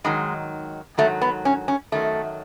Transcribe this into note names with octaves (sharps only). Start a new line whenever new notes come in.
G#2 D#3 F#3 G#3
G#2 D#3 F#3 A3
B3
C#4
C#4
F#2 D#3 F#3 A3